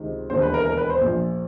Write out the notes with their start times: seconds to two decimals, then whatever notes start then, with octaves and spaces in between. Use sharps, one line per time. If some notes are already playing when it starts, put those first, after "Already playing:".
Already playing: C#2 C3 D#3
0.30 E1 D#2 D3 C5
0.42 B4
0.54 A#4
0.66 A#4
0.77 B4
0.90 C5
1.01 A#1 A#2 F3